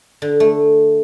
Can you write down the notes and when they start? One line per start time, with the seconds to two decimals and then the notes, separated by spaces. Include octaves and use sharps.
0.22 D3
0.40 A3